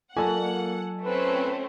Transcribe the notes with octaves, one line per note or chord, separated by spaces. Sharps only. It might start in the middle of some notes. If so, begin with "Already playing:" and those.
F#3 A#3 F4 A4 F#5 G#5
A3 C4 C#4 B4